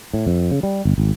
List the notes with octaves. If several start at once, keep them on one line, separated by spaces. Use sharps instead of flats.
A2
F2
C#3
G3
G1
G#1